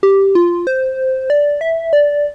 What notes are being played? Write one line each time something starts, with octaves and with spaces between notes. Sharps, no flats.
G4
F4
C5
D5
E5
D5